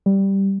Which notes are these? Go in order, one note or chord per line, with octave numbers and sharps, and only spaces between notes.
G3